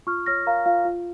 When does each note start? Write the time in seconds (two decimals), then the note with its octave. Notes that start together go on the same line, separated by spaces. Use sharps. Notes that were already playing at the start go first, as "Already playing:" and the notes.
0.07 F4 C#6 F6
0.26 C#5 F6 A#6
0.46 A#4 F5 A#5
0.66 F4 F5
0.85 F4